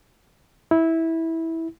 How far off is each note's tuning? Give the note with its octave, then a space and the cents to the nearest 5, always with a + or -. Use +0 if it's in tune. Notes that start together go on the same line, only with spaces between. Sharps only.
E4 -15